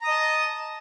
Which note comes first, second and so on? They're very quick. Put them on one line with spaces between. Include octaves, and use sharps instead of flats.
A#5 D#6 D#5 A5